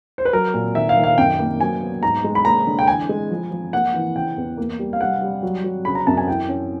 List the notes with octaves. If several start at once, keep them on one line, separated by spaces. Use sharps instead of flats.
C5
B4
F#3 A#4
A#2
D#3 E5
F5
D#3
F5
F#2 G5
A#3
F#3 G#5
B3
G#2 A#5
G#3
B5
A#3 A#5
D3
G5
E3 G#5
G#3
F3
F3
A#3 F#5
E3
C#3 G5
E2
A#3
G3
F5
G3 F#5
G3
F#3
F#3
C#3 B5
A#5
F#2 A5
G#5
E4 G5
C#4